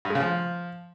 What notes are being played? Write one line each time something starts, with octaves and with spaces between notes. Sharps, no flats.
G2
G#3
C#3
F3